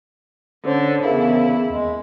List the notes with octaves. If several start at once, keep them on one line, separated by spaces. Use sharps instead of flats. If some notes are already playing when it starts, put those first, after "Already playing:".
D3 C#4 C5 C#5
E2 C#3 E4 G#4 A#4 F5
D#2 G#3